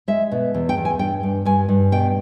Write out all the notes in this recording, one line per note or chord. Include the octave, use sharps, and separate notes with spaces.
G#3 E5
B2
E2
G5
E2
G#5
G2 G5
G2
G2 G#5
G2
B2 G5